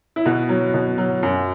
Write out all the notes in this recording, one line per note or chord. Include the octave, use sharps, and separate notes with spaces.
E4
B2 F#4
F#3
B2
F#3
F#2